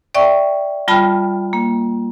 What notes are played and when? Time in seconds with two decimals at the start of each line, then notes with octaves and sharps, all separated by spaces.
0.15 D5 E5 G5 C#6
0.88 G3 F4 G5 A5 B5 F6
1.53 A#3